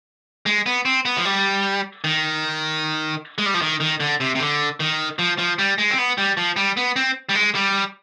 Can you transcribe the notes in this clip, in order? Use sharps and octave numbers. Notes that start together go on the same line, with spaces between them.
G#3
B3
C4
B3
F3
G3
D#3
G#3
G3
F3
D#3
D#3
D3
C3
C3
D3
D#3
F3
F3
G3
G#3
C4
B3
G3
F3
G3
B3
C4
G3
G#3
G3